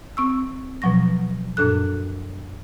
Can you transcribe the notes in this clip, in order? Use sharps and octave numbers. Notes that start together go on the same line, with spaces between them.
C4 C#6 E6
B2 F3 F#3 C#6 A#6
F#2 A#2 D4 A4 F#6